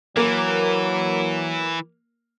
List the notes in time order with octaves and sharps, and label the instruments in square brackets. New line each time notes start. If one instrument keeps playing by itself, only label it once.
[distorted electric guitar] E3 [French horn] F#3 [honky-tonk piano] A#3